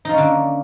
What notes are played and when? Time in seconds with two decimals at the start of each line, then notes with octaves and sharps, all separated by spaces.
0.05 D#4
0.09 F3
0.13 C#4
0.18 D3
0.22 A#3